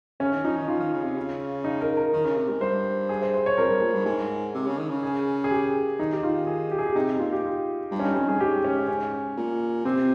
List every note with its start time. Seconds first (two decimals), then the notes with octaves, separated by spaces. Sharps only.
0.20 C#3 C#4
0.32 D#3
0.44 F3 D#4
0.57 D#3
0.68 F3 F4
0.80 D#3
0.93 C#3
1.04 C3
1.17 C#3
1.64 D#4
1.81 A#4
1.97 A#4
2.13 D#3
2.25 C#3
2.37 C3
2.49 G#2
2.61 G2 C5
3.09 G#4
3.22 C5
3.34 C5
3.46 C#5
3.58 F2 A#4
3.69 G2
3.82 A#2
3.94 G2
4.05 G#2
4.54 C3
4.66 C#3
4.78 D#3
4.90 C#3
5.03 G#4
5.44 G#4
5.51 G4
5.99 D#3 D#4
6.13 G4
6.22 D#3 F4
6.47 G#4
6.71 G4
6.79 G#4
6.86 G4
6.95 C3 D#4
7.19 A#2 F4
7.33 G4
7.45 F4
7.91 G2
8.00 C#4
8.04 D#4
8.16 F2 C#4
8.28 G2 G#4
8.40 G#2 G4
8.64 C#4
8.88 C#4
9.37 A#2
9.85 C3 C4